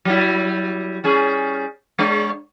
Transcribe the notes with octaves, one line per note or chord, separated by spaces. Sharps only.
F#3 G3 E4
G3 C#4 G#4
G#3 D4 C#5